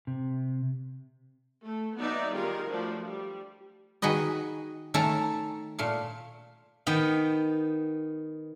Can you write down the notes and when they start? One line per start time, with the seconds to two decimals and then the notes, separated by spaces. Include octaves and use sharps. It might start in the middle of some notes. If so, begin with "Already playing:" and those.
0.07 C3
1.64 A3
1.97 F#3 B3 D#4 D5 E5
2.34 D#3 G3 F4 G#4 A#4
2.70 F3 F#3 A3 D4
3.04 G3
4.02 D#3 F#4 G#4 B4 D#5
4.94 D#3 A3 C#4 A4 A5 A#5
5.79 A#2 A3 F5
6.87 D#3 B3 G5